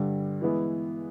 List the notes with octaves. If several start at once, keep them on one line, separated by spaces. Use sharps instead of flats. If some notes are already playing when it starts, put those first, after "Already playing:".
Already playing: G2 D3 G3
E3 G#3 B3 E4